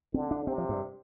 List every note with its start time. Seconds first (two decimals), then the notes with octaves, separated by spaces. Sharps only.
0.14 D3 C4
0.31 D4
0.47 C3 C4
0.58 F3
0.69 G2